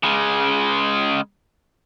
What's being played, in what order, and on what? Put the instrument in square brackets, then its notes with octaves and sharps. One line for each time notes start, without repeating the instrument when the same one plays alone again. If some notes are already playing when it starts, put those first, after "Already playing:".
[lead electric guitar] C#3 G#3